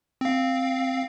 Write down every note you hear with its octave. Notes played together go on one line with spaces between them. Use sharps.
C4 F5